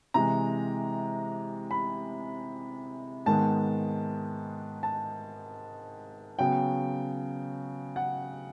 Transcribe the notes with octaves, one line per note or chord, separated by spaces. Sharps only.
C3 E3 G#3 A#5
B5
G#2 D#3 G#3 B3 A5
A5
C#3 F#3 B3 G5
F#5